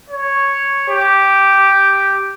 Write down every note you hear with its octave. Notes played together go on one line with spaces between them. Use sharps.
C#5
G4